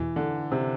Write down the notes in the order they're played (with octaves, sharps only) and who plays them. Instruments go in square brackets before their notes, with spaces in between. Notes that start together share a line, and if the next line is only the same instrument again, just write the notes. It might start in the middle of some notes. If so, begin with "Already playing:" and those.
Already playing: [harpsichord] E2 B2 [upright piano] E3
[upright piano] D3
C3